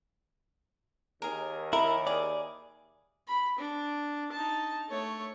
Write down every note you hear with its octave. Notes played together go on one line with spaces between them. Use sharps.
D#2 G#4 A#4
E4 A#4 E5 B5
G#4 D5
B5
D4
D#4 A5
A3 C#5